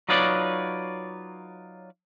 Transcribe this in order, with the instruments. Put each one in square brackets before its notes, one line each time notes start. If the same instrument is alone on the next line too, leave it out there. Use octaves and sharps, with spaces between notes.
[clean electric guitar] F#3 D#4 F4 B4 C#5 D5